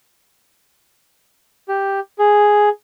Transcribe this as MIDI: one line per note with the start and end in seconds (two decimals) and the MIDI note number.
1.69 2.00 67
2.19 2.69 68